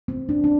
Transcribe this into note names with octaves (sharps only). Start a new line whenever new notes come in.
C4
D4
D4